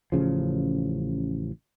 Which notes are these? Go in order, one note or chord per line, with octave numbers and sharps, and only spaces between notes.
A1 C#3 F3